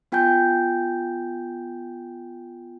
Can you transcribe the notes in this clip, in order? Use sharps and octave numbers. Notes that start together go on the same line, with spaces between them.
B3 F4 G5 G#5 G6